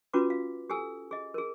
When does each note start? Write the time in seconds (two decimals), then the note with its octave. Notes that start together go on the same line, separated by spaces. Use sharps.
0.13 C#4 F4 F#4 B4 D6
0.30 F5
0.70 G4 A4 G#5 E6
1.11 G#4 D#5
1.34 G#4 A#4